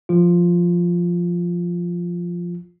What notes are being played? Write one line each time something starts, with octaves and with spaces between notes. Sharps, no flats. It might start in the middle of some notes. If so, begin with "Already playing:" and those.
F3 F4